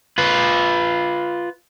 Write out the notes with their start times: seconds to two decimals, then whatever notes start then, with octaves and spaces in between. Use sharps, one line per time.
0.18 F4 B4